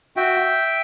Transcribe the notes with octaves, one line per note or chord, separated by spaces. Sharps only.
F#4 E5 G5